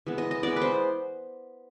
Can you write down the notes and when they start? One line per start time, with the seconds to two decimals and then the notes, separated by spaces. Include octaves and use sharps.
0.07 E3 G#3 B3
0.18 D#5
0.31 D#5
0.43 E3 G#3 B3 D5
0.56 B4
0.62 C5